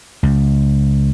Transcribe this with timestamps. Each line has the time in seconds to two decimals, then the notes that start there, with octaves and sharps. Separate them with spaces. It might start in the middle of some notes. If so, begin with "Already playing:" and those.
0.23 C#2